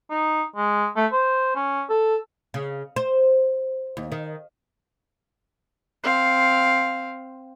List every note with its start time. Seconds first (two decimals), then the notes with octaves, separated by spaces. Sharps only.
0.10 D#4
0.56 G#3
0.97 A3
1.12 C5
1.56 C#4
1.90 A4
2.54 C#3
2.96 C5
3.97 D#2
4.12 D#3
6.04 C4 F5